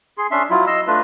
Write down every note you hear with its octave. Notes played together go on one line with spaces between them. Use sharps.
G#4 C6
C#4 D4 E5 C6
F#3 E4 F4
D#5 C6 E6
A3 D4 F4 B4